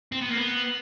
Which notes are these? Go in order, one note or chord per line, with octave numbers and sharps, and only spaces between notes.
C4
B3
A#3
B3